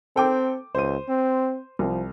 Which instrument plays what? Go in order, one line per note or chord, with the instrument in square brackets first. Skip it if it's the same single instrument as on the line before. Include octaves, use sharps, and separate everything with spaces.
[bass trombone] C4 [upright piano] A4 G5 D6
[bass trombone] C#2 [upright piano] C5 D#7
[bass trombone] C4
[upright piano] C2 [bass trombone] F3